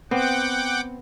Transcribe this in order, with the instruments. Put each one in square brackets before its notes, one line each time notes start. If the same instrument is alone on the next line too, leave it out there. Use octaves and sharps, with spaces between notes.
[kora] B3 [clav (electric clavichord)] C4 [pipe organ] F#5 G5 D6